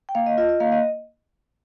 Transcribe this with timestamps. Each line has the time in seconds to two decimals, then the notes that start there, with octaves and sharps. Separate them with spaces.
0.09 G5
0.15 A#3 F5
0.26 D#5
0.38 F4 D#5
0.49 D#5
0.60 A#3 F5
0.72 D#5